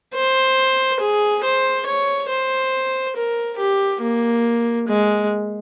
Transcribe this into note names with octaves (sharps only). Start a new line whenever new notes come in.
C5
G#4
C5
C#5
C5
A#4
G4
A#3
G#3